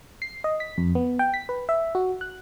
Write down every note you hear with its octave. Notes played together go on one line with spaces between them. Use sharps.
C7
D#5
B6
F2
B3
G5
B6
B4
E5
F#4
F#6